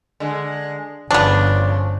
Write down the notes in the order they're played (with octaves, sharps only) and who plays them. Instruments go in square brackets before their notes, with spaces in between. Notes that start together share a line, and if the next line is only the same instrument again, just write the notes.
[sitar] D3 G#3
[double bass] G1 [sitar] C#3 F3 [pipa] B3 D4